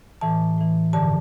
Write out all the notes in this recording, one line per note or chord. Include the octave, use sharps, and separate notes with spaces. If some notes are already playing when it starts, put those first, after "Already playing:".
A2 E3 A5
A2 E3
G2 D3 F3 A5